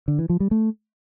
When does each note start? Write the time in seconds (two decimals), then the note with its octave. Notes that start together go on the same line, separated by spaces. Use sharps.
0.08 D3
0.19 E3
0.29 F3
0.40 G3
0.51 A3